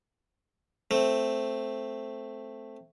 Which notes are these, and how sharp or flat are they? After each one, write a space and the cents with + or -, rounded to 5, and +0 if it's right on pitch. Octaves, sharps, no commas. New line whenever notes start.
A3 +0 C4 +0